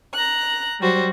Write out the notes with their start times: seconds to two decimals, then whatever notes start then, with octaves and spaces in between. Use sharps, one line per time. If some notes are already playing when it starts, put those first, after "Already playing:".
0.14 A#5 F#6
0.79 F#3 G3 F#4 C5